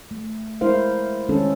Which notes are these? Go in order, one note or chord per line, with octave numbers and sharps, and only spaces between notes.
A3
G#3 E4 A#4 C5 F5
D#3 G#3 C#4 A4